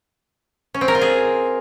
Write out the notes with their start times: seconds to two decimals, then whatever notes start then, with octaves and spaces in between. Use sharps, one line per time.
0.74 C#4
0.81 C4
0.88 A#4
0.95 F4
1.02 G#4